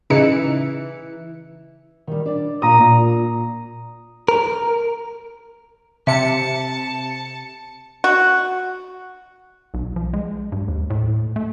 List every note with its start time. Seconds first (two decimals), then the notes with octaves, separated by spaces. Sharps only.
0.10 C#3 E3 D#4 C#7
2.07 D#3 G3
2.25 D4 D5
2.62 A#2 A#5 D#6
2.79 A#2 F4
4.28 A#4
6.07 C3 E5 A5 C#7
8.04 F#4
9.74 B1
9.96 F3
10.13 G#3
10.52 G2
10.68 D#2
10.90 A2
11.36 A3